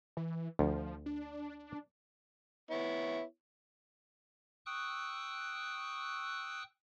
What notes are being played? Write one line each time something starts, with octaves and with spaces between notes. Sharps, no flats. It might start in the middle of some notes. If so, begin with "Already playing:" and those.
E3
D2 F3
D4
B3 E4 C#5
G5 C#6 D#6 E6 F#6